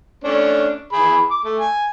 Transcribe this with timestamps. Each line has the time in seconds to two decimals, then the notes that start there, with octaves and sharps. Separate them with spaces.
0.24 A3 C#4 D4
0.93 E3 G#4 B5
1.31 D6
1.44 A3
1.60 G#5